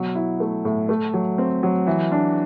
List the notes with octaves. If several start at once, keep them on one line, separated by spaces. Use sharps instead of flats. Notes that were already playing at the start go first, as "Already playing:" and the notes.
Already playing: B2 F#3
E4
A3
A2
A3
F#3
C4
F#3
E3
D4